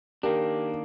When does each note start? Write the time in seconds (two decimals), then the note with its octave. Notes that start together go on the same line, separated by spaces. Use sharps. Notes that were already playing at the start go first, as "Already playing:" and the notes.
0.23 D#3 A#3 D4 G4 A#4